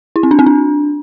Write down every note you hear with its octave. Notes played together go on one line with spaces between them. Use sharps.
E4
C4
D4
C4
D4